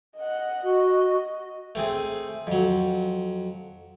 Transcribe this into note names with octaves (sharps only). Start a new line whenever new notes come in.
D#5 F#5
F#4 D#5
A3 C4 G#4
F2 F#3